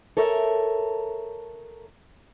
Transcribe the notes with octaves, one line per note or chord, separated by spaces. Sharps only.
A4 A#4 C#5 E5